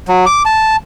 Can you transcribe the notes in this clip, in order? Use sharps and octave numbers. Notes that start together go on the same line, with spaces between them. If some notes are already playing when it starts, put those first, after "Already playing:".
F#3
D6
A5